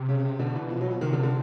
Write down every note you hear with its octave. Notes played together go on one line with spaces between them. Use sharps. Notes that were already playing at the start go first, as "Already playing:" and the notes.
Already playing: C3
C#3
B2 D3
E3
F3
F#3
F3
C3 D#3
D3
D3